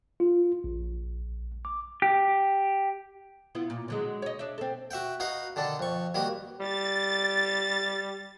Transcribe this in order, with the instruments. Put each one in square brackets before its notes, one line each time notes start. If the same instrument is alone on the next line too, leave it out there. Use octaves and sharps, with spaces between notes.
[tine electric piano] F4
A#1
D6
[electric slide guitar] G4
[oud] B3 E4 F4
A#2
D3 F#3 G#3
C#5 D#5
D4 E5
C4 A4
[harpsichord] F#4 E5 F#5 G5
D#4 F#4 B4 F5 F#5
D3 D#3 D4 A4
F2 C#6
D#3 G3 A#3 F#4 B4
[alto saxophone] G3 [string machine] A6